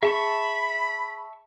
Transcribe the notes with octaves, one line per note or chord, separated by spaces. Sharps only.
G#4 E5 A5 B5 C#6